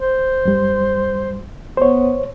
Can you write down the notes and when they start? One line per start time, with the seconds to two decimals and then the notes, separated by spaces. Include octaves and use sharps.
0.01 C5
0.45 F#2 G3
1.77 B3 C5 C#5